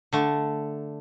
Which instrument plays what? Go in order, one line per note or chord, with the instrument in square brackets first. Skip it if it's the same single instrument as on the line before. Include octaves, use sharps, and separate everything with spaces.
[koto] D3 A3